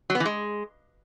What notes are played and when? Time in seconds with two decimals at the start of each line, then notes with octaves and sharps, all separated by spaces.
0.10 F#3
0.15 B3
0.20 E3
0.26 G#3